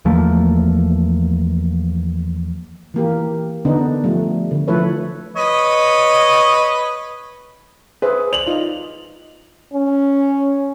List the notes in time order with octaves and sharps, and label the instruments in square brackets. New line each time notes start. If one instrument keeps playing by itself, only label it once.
[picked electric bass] E2 F3 A3 A#3
[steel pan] E3 A#3 G4
D3 B3 D4 D#4
F3 G3 A3
D3
F3 A3 E4 A4 B4 C#5
[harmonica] B4 C#5 D#5
[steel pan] G#4 C5 E5 [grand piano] B4
[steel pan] D5 [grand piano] F7 F#7
[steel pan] D#4 F4 D#5
[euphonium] C#4